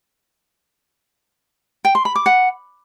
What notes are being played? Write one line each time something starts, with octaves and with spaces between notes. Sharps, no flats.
G5
C6
B5
D6
F#5